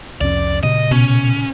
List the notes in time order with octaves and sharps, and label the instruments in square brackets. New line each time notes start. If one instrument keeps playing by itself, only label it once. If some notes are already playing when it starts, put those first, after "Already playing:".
[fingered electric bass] C2 F2 C#4 [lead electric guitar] D5
[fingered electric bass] A#2 C#3 [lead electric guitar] D#5
[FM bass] B2 [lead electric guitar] C#4